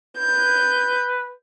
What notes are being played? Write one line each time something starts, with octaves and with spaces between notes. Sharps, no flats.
B4 G6